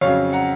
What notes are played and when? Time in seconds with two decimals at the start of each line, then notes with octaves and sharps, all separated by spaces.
0.01 F2 C#3 F#3 C#5 F5
0.33 F#5 A#5